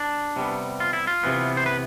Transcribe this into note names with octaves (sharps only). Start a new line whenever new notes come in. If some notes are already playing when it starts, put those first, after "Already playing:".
Already playing: D4
C3 G3 B3
F4
E4
F4
C3 E3 B3
C5
B4